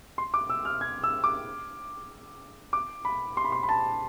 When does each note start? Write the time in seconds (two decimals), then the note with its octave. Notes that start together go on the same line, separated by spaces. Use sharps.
0.18 C6
0.34 D6
0.50 E6
0.65 F6
0.81 G#6
1.04 E6
1.24 D6
2.73 D6
3.05 B5
3.37 C6
3.44 B5
3.52 C6
3.63 B5
3.69 A5